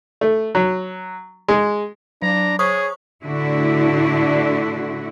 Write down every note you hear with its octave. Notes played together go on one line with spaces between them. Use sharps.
A3
F#3
G#3
F#3 D4 A#5
G#4 C5 C#5 C#6 D#6
A2 D3 D4 E4 F#4